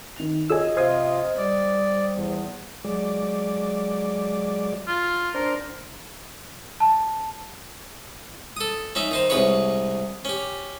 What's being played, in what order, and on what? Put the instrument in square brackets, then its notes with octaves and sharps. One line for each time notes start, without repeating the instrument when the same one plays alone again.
[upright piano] D#3 F7
[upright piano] F4 G#4 C#5 [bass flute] D#5 [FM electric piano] G#5 D#6 E6
[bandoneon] C3 F4 [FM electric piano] C5 D#6 [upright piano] F6 G#6 C7
[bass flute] G3 [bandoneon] D5
[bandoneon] E2
[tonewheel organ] F#3 G#3 D5
[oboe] F4
[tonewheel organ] D4 C5 [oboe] A#4
[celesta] A5
[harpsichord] A4 D#6
C#4 D#4 E5
D#3 D#4 C5
C2 G#3 B4 C#5 C#6
C#4 G4